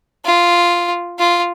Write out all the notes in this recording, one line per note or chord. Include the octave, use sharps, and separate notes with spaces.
F4
F4